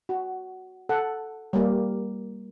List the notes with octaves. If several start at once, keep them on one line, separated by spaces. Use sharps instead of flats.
F#4
A4 F#5
G3 A#3